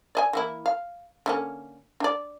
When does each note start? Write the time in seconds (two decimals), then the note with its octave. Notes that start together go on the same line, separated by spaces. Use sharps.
0.15 D5 D#5 G#5
0.33 E3 A#3 E4
0.66 F5
1.26 D3 A#3 C#4
2.00 D4 D5